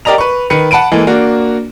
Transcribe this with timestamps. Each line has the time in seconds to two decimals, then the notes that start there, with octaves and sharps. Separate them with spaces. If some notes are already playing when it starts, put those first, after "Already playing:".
0.05 G4 A#4 D5 D#5 A#5 F7
0.18 B4 C#6
0.50 D#3 B4 C#7
0.71 F#5 A5 B5 D7 D#7
0.92 E3 G#3 A#3 A4
1.07 A#3 D4 F#4